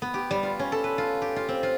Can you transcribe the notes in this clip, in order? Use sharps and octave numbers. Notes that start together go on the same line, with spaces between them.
B3
G4
G3
F4
C#4
A4
B4
F4
G4
F4
C4
F4